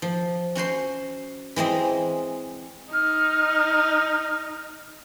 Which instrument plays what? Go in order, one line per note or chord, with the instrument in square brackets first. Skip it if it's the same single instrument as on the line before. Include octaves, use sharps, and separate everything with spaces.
[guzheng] F3
C#4 F#4 C5 C6
E3 G#3 C4 D#5
[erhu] D#4 [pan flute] F6